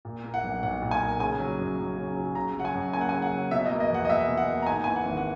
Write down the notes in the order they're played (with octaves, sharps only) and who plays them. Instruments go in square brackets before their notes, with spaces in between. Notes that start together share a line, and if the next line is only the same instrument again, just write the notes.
[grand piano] A#2
A#3
F#5
B1
B1 F#5
A#2
G#5
A#3
C#3 G#5
F#3
F#2
F#2
C#3
F#3
C#3 A#5
F#3 F#5
G#5
F#2
A#3 G#5
F#5
G#5
C#3
F#5
F#3
B2 E5
D#5
A#3
D#5
E2 F#5
D#5
E2 E5
B2
F#5
A#3
A#5
G#2 G#5
E3 G#5
F#5
G#1
F#5